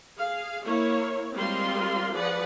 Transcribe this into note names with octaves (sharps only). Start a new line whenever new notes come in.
G#4 F5
A#3 E4 C#5
G3 G#3 C4 F4 A#4 C6
F3 G#4 B4 D5 F#5